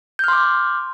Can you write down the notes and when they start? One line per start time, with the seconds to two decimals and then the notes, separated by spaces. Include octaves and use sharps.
0.19 G6
0.24 F6
0.28 C6
0.33 D6